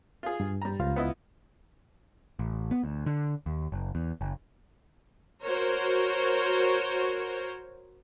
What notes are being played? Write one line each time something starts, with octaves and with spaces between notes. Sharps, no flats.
F4 G#4
G2
G3 A#5
C#2 F4 F5
B3 E4 D#5
A1
B3
D2
D3
D#2
F#1
E2
F#1
F#4 A#4 C5 C#5